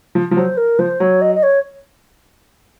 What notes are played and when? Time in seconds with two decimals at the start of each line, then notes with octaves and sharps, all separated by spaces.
0.15 F3
0.31 F3
0.37 F#3 C5
0.57 A#4
0.79 F3 C5
1.00 F#3 C#5
1.21 D#5
1.35 D#5
1.43 C#5